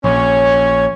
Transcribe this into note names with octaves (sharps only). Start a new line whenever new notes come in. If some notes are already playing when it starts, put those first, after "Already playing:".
A#1 C#4 C#5